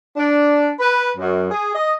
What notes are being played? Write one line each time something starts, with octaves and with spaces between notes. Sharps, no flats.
D4
B4
F#2
G#4
D#5